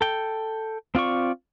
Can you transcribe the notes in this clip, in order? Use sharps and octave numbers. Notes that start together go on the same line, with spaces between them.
A4 G5
C4 F4 D5 C#6